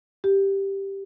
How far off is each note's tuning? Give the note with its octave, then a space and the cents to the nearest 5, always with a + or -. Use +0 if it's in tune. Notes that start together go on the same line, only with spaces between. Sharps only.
G4 +0